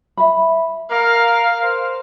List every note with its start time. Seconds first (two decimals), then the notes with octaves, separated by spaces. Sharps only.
0.17 E5 B5
0.91 A#4 F5
1.63 C5